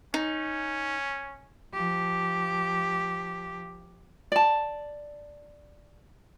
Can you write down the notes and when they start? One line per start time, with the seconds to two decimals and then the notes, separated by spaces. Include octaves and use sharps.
0.14 C#4 D#4
1.73 F3 G4
4.32 D5 A5